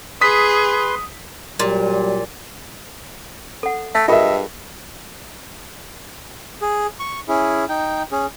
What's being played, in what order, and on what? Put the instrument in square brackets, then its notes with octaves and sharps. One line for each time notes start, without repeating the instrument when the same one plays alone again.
[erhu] G#4 [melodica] B4 C6 [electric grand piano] D#6 B6
[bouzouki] A#2 [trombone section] F#3 G3
[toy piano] A4 F#5
[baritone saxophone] A3 [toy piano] E5
[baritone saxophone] G2 [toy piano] F4 G#4 A#4 [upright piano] D#5 E5
[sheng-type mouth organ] G#4
C#6
C#4 E4 G#4
D#4 G5
C#4 G#4